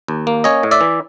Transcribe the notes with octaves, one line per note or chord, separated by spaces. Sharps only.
D#2
A#3
C#4 C#5 D#5
A2
D5 E5
E3